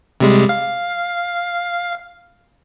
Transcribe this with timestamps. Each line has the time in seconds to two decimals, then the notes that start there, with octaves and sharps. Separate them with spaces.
0.20 C3 G3 G#3
0.49 F5